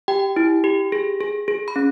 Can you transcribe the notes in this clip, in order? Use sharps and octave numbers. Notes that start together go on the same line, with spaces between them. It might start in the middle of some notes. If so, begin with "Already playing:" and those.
G4 G5
E4
G4
G#4
G#4
G#4
B5
C#4